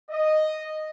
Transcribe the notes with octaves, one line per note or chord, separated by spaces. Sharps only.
D#5